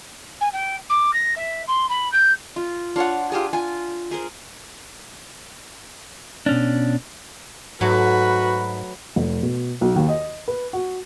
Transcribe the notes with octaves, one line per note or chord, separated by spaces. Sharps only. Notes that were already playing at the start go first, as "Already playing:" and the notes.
G#5
G5
D6
A#6
E5
C6
B5
G6
F4
D4 F4 C#5 F#5
F4 G4 G#4
F4 G#5
G#4 A#4 C5
B2 C#4 D4
G#2 F#3 A3 F#4 B4
F1
B2
B1
D#2
D#5
B4
F#4